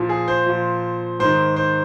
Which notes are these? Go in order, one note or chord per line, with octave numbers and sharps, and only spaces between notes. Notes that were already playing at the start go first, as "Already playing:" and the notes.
Already playing: A#2 F3
G#4
C5
A#2 F3
G#2 D#3 C5
C5